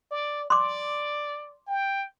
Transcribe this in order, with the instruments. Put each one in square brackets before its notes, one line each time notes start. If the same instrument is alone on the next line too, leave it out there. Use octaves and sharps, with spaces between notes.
[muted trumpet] D5
[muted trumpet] D5 [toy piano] C6 D6
[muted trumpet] G5